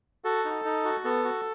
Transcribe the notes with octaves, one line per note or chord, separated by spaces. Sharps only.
F#4 A4
D#4
D#4
F#4
B3 A4
F#4